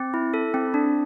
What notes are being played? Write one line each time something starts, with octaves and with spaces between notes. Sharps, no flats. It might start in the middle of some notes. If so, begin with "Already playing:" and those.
Already playing: C4
E4
A4
C4
D4